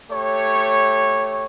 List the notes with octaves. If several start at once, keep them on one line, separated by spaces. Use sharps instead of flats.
A3 G4 C#5